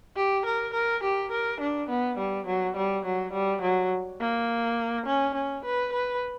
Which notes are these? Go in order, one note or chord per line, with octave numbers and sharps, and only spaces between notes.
G4
A#4
A#4
G4
A#4
D4
B3
G3
F#3
G3
F#3
G3
F#3
A#3
C#4
C#4
B4
B4